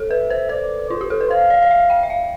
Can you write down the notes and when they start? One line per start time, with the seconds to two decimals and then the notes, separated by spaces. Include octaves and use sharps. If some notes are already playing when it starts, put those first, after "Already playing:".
Already playing: A4
0.10 B4 E5
0.30 C5
0.49 C5 D5
0.90 F4 C5
1.01 G4
1.10 A4
1.21 B4
1.30 C5 F5
1.50 D5
1.62 D5
1.71 E5
1.90 G5
2.03 E5
2.10 F5